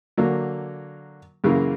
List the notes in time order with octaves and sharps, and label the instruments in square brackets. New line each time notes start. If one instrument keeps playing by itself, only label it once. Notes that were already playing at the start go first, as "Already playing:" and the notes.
[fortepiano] D3 F#3 A#3
F#2 C#3 E3 A#3